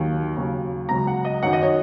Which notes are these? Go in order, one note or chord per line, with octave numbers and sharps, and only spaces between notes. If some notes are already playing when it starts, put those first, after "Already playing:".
Already playing: D#2 D#3 F#3
D#2 C#3 F#3
C#2 C#3 F#3 A#5
F#5
D#5
F#2 D#3 F#3 F#5
D#5
C#5